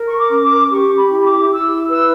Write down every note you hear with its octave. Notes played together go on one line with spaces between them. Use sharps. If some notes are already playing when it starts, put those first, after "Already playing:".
Already playing: A#4
C#6
D6
C#4
D6
G4 C#6
B5
E4
D6
E4 E6
B4 E6